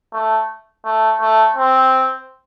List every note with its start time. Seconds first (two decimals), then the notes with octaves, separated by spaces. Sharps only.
0.13 A3
0.85 A3
1.20 A3
1.56 C4